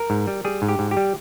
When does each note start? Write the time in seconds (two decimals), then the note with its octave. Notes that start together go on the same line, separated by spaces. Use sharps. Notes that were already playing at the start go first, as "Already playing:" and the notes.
Already playing: A#4
0.10 G#2
0.27 G3
0.45 G3 G#4
0.62 G#2
0.68 G4
0.79 G#2
0.91 G4
0.97 G3